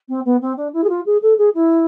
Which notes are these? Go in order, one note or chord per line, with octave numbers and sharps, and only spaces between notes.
C4
B3
C4
D4
E4
G#4
F4
G#4
A4
G#4
E4